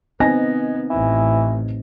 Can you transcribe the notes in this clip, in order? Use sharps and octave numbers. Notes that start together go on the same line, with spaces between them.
B3 C4 D#4 D#5 G#5 A#6
A1 A2 E3